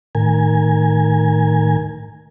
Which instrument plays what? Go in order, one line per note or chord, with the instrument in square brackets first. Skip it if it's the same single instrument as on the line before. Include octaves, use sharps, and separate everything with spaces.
[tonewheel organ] A2 D#3 A#4 G#5